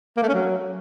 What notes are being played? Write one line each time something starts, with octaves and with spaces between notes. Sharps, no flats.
A#3
A3
C#4
F#3